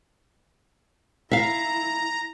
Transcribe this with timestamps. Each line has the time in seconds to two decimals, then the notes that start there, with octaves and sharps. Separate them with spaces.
1.31 E4 E5 F5 A#5